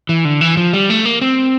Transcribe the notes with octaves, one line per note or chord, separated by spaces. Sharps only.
E3
D3
E3
F3
G3
A3
A#3
C4